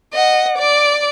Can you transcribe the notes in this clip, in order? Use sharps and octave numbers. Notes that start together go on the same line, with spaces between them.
D#5 F#5
D5 D6